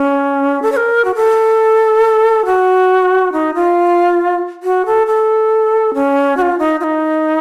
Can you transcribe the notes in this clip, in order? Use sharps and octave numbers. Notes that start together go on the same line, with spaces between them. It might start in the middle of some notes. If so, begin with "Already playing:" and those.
Already playing: C#4
A4
C#5
A#4
F#4
A4
F#4
D#4
F4
F#4
A4
A4
C#4
F#4
F4
D#4
F4
D#4